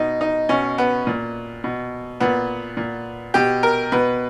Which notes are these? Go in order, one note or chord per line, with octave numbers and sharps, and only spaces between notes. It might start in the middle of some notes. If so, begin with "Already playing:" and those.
Already playing: B2 D#4
D#4
B2 C#4
B3
A#2
B2
A#2 B3
A#2
B2 G4
A#4
B2 B4